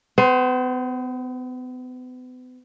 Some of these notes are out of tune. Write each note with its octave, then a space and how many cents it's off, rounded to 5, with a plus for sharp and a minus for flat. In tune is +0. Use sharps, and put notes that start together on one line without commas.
B3 +40 C5 +0